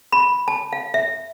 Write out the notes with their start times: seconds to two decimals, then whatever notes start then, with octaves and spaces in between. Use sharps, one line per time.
0.12 B5
0.48 A5
0.73 F5
0.94 E5